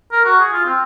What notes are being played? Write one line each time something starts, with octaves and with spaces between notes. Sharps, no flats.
A#4
F#4
G#4
F4
C4